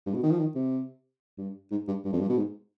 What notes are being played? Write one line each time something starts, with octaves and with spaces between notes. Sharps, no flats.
G2
B2
D#3
F3
D#3
C3
G2
G#2
G2
G2
F2
G2
B2
G#2